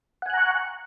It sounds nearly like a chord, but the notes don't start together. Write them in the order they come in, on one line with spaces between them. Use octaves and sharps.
F#5 G#5 F#6 A#5 C#6